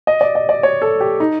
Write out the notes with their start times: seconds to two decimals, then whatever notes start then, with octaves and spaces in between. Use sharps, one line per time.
0.07 D#5
0.21 D5
0.35 D#5
0.49 D5
0.63 C#5
0.82 A4
1.00 G4
1.20 D#4